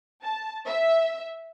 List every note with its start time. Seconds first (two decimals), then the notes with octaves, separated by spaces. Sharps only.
0.23 A5
0.66 E5